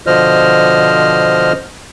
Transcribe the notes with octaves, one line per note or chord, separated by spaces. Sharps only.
B2 D3 F3 C5 D#5 F6